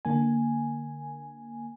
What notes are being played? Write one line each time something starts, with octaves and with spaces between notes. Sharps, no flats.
D3 A#3 G#5